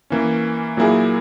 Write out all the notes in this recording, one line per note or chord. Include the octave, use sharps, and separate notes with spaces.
E3 A#3 C#4
A#2 F#3 A#3 E4 G#4